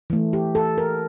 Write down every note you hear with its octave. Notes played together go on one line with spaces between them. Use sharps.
E3 A3
G4
A4
A#4